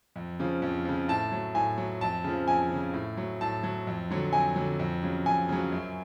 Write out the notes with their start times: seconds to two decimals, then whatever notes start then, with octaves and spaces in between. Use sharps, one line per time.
0.16 F2
0.40 C#3 F3
0.62 F2
0.85 C#3 F3
1.08 A2 A5
1.32 F#3
1.55 A2 G#5
1.78 F#3
2.01 F2 A5
2.24 C#3 F3
2.48 F2 G#5
2.71 C#3 F3
2.93 A2
3.17 F#3
3.41 A2 A5
3.63 F#3
3.87 F2
4.10 D3 F#3
4.33 F2 G#5
4.56 D3 F#3
4.79 F2
5.03 C#3 F#3
5.26 F2 G#5
5.49 C#3 F#3
5.72 F#2